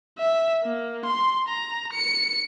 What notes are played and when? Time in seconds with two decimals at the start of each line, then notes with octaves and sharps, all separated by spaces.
0.18 E5
0.63 A#3
1.05 C6
1.48 A#5
1.93 C#7